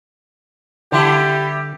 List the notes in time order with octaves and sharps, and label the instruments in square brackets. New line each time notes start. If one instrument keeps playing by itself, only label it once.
[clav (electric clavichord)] D3 [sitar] G3 E4 [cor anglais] G4